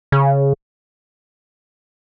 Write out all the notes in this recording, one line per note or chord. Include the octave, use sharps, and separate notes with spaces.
C#3